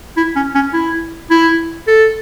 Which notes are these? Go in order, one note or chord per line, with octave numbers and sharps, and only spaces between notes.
E4
C#4
C#4
E4
E4
A4